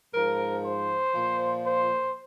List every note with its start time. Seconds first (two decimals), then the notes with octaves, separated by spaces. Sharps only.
0.14 G#2 F3 A#4
0.64 C5
1.14 A#2 F3
1.64 C5